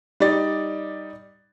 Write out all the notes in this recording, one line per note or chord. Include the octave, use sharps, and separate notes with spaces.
G3 D#4 D5 A6